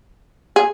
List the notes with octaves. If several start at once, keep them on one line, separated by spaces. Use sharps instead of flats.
G#4